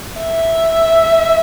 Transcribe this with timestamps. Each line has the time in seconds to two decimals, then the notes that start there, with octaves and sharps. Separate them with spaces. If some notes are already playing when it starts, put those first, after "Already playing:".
0.19 E5